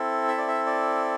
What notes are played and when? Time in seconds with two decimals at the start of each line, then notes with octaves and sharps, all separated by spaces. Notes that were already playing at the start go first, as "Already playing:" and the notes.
Already playing: C4 E4 A4
0.28 E5
0.38 D5
0.48 E5
0.66 D5